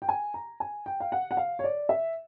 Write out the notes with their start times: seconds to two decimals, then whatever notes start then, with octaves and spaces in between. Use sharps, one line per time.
0.02 G5
0.09 G#5
0.34 A#5
0.60 G#5
0.86 G5
1.00 F5
1.12 F#5
1.31 F#5
1.37 F5
1.59 C#5
1.64 D5
1.89 E5